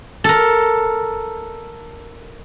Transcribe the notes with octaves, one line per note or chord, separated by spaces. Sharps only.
A4 A#4